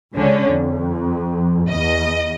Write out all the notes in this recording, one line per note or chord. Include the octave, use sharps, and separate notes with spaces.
C#2 D3 C#4
F2
E2 D#5